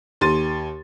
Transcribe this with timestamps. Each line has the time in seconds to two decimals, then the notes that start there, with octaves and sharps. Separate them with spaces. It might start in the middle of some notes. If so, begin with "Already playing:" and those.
0.21 D#2 C6 A6 D#7